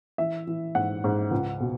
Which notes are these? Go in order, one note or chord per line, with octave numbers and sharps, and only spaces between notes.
E3 E5
E3
G#2 F#5
G#2
C#2
B2